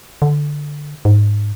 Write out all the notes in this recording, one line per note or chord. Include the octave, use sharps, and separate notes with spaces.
D3
G#2